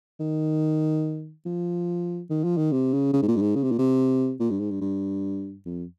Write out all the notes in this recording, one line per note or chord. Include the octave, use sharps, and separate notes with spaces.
D#3
F3
D#3
F3
D#3
C3
C#3
C#3
G#2
A#2
G2
G#2
C#3
C3
A#2
C3
A#2
G2
G#2
G2
G2
F2